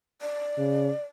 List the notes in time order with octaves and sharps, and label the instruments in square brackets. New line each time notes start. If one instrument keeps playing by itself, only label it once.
[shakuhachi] D5
[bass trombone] C#3